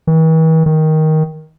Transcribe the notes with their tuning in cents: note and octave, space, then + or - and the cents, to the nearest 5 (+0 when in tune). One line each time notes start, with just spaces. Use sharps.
E3 -45
D#3 +10